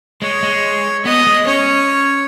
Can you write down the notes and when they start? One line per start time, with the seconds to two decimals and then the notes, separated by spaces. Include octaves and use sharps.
0.22 G#3 C#5
0.43 G#3
1.05 B3 D#5
1.27 G#3
1.47 C#4 C#5